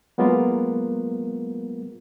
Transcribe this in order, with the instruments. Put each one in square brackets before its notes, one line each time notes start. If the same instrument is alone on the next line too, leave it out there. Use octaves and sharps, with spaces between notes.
[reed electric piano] F#3 G#3 A#3 B3 F4 A#4